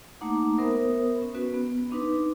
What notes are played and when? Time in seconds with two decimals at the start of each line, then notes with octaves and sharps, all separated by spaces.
0.21 A3 A#3 D#4 F#5 A#5 D6
0.58 B3 A#4 C5 E5 D#6
1.22 C#4
1.35 B3 C#4 F#4 B4
1.54 B3
1.91 C4 D4 D#4 B4